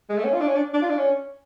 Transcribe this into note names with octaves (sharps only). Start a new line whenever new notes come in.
G#3
A3
C#4
F4
D4
C#4
D4
D4
F4
D4
C#4